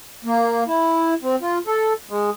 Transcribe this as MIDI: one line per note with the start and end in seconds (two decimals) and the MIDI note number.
0.25 0.64 58
0.67 1.14 64
1.23 1.36 60
1.42 1.59 65
1.67 1.93 69
2.09 2.30 56